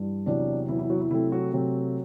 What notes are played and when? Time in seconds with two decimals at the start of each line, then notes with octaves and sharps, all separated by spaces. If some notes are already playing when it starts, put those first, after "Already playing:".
Already playing: G2 E3 G3
0.26 E2 C3 F#3 D4
0.68 E2 C3 F#3 E4
0.79 E4
0.90 F#3 F#4
1.00 E4
1.11 C3 F#3 A3 C4 E4
1.32 F#3 F#4
1.53 C3 F#3 A3 C4 F#4